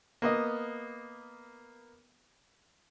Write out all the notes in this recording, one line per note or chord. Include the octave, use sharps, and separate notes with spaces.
A#3 B3 D#5